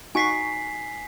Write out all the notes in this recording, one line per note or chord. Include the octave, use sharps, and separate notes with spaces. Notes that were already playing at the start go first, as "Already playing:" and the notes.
D#4 F#4 G#5 C#6 B6 C7